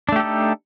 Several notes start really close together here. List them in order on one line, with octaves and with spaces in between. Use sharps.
D4 A3 G4 A4 D#4